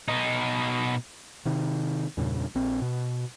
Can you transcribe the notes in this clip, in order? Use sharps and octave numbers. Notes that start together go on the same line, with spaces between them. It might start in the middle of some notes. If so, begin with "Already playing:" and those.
B2 D#4
C3 D#3
E2 G2 A#2 C#3
A#1 C4
B2